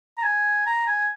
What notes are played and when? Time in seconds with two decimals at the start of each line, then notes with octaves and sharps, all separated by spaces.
0.18 A#5
0.23 G#5
0.67 A#5
0.87 G#5